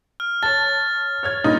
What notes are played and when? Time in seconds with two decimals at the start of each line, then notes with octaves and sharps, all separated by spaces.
0.20 F6
0.43 C#5 A5 A6
1.23 C#5 F6 G#6
1.44 G2 A#2 D#4